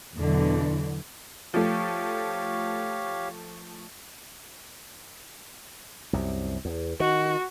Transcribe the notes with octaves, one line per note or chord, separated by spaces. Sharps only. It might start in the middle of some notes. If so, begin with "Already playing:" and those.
E2 B2 D3 E3 F#3
F3 A3 G4 C#5 F5
C2 F#2 C3
E2
D#3 F#4